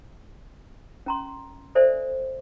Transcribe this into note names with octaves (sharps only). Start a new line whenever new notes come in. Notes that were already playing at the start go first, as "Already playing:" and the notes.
C#4 A#5 C6
A4 C5 D5 E5 G#5